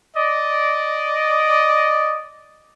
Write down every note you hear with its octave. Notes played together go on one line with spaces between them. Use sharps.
D5 D#5